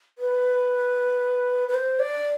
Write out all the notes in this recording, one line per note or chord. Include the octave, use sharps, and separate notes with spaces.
B4
B4
C5
D5